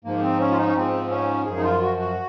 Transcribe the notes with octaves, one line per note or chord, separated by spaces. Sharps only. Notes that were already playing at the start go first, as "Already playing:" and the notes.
G#2 F3 A#3
C4
C#4
F4
D#4
C#4
G#2 F3 C4
C#4
F#2 F3 G#4
D#4
F4
F#4
F#4